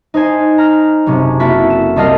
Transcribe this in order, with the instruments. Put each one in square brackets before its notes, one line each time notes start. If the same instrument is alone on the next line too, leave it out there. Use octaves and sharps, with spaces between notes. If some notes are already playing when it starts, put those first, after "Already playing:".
[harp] D#4 C5 G#5
A#5 F6 A#6
F#1 C3 C#4
A#3 E4 F#4 A4 B6
E7
C2 A4 D#5 F5 A#6